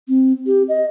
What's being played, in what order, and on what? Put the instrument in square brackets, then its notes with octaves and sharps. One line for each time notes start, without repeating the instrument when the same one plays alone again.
[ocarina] C4
G4
D#5